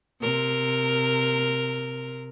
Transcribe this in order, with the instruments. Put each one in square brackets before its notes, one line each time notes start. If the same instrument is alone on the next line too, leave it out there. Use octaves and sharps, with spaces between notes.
[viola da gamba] C3 A#4